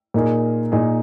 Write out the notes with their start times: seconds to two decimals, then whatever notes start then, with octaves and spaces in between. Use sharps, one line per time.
0.14 A#2 A#3 D#4 G#4
0.72 A#2 A#3 D#4 G#4